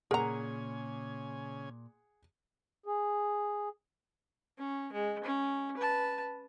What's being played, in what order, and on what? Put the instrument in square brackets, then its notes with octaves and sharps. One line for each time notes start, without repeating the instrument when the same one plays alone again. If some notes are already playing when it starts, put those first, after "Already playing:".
[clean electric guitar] A#2 [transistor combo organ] C#3 C#5 G#5 [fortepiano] G#4 F#5 [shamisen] A#4 A#5
[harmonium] G#4
[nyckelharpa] C#4
G#3
C#4
B4 A5